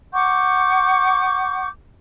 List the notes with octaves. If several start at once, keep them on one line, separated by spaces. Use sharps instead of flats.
F#5 C#6 D6 G6